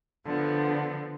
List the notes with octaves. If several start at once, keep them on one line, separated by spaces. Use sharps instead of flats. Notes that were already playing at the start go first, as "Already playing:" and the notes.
D3 F3 B3